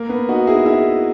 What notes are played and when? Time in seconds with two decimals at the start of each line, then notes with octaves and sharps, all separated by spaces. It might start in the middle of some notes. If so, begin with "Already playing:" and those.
Already playing: A#3
0.09 B3
0.29 D#4 F#4
0.47 E4 G#4
0.66 E4 G#4